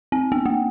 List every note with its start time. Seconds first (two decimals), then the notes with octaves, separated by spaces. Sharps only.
0.12 C4
0.32 B3
0.45 A#3